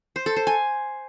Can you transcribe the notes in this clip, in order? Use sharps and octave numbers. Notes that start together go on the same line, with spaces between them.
C5
A4
C5
G#5